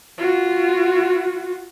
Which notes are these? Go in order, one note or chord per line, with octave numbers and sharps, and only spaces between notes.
F4 F#4